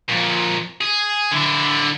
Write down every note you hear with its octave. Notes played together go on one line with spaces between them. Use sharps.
F2 A#2
G#4
D3 E4